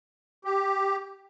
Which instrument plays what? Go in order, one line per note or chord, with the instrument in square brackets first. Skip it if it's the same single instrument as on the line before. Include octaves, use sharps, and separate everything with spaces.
[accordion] G4